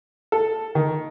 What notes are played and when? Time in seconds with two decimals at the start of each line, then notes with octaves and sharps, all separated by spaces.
0.32 A4
0.75 D#3